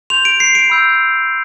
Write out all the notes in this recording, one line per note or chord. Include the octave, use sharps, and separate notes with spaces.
C6 G6 F7
D7
C7
D7
B5 E6 G6